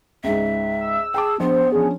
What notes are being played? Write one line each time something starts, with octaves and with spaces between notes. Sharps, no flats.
C#2 G#2 E5
E6
G#4 G5 A5 D6
A#1 B3 C5
F3 C#4 D4 G#4